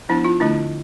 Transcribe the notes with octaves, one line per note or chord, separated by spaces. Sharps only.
F3 B3 D4 E4
F4
D3 A3 D4 E4